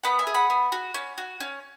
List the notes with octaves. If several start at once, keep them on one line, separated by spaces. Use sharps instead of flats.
B3 F#5 B5
E5 G#5
G#4
F#5 B5
B3
F#4
C#4
F#4
C#4